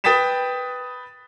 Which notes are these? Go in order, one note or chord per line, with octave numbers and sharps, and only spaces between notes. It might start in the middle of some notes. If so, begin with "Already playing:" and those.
B4 G5 D#6 A6 B6 E7